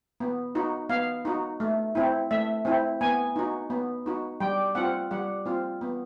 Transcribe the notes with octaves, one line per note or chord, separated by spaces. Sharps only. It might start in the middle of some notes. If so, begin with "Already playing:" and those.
B3
D#4 F#4
B3 F5
D#4 F#4
A3
C4 E4
A3 E5
C4 E4
B3 G#5
D#4 F#4
B3
D#4 F#4
G3 G5
C4 F4 F#5
G3 F#5
C4 F4
B3